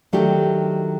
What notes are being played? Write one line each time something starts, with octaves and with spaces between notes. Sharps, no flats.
D#3 F#3 A3 D4 G4